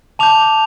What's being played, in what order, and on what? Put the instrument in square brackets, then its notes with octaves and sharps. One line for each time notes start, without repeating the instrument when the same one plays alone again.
[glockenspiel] A5 D6 G6 F7